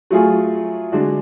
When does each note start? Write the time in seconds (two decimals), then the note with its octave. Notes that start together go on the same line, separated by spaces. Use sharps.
0.11 F#3 A3 F4 G#4
0.92 D3 G#3 D4 F#4